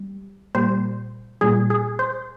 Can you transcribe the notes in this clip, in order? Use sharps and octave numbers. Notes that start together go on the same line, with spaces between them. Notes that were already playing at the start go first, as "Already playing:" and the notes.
Already playing: G3
A#2 G3 C5
A#2 G3 G#4
G#4
C5